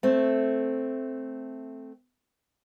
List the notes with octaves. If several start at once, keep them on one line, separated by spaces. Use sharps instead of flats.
A3 C4